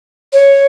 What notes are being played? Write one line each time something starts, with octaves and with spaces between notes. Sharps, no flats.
C#5